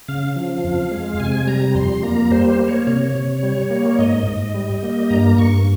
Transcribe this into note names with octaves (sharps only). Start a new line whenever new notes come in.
C#3 F5
F3
F2
G#3
C3 G#5
G3 A#5
F2 C6
A#3 A#5
G3 C5
C5
A#3
C#5
C3 C#5
C3
G3
A#3
G#2 D#5
G#2
G3
A#3
G2 A#5
G2 C#6